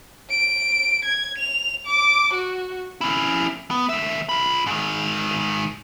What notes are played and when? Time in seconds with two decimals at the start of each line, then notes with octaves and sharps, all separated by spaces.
0.30 D7
1.05 G#6
1.38 F7
1.86 D6
2.33 F#4
3.01 C#4 E4
3.71 B3
3.89 D#2 E5
4.29 F4 B5
4.67 G#2 D#3